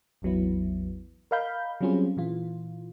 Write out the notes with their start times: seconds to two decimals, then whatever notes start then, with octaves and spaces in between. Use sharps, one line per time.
0.22 A1 E2 F#3 B3 E4
1.31 A#4 D#5 F5 B5 G6
1.81 F#3 G3 C4 C#4 F4 G#4
2.17 A#2 E3 F4